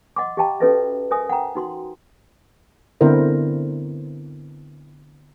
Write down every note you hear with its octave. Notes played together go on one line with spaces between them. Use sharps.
D#5 F#5 C6 D6
G4 D#5 F5 G5 A5 A#5
C#4 F#4 A4 B4 D#5 E5
A#4 C5 E5 G#5 D#6
F#5 G5 A#5
D#4 F#4 C6
D3 B3 C4 E4 A#4 C5